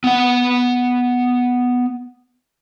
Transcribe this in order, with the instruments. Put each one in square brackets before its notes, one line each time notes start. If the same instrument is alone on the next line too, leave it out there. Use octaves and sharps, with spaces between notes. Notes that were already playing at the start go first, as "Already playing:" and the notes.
[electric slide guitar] B3 F#5